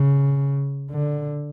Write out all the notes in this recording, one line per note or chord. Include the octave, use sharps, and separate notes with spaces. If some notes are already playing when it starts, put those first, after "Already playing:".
Already playing: C#3
D3